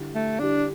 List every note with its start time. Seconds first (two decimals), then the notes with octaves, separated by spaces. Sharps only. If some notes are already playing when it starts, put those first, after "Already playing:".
Already playing: D3 G3 E4 G4
0.15 A3
0.40 D3 G3 D4 E4 G4